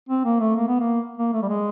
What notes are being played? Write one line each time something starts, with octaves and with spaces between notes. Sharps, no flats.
C4
A#3
A3
A#3
B3
A#3
A#3
A3
G3
G#3